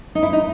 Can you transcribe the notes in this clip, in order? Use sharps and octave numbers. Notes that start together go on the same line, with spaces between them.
D#4
E4
D#4